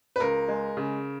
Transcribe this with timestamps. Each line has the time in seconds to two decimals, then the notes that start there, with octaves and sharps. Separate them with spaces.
0.16 B4
0.20 C#2 A#4
0.48 G#3
0.77 C#3